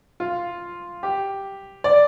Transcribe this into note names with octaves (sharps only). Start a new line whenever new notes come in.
F4
G4
D5